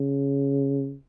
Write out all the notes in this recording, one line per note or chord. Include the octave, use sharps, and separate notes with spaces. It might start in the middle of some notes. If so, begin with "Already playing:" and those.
Already playing: C#3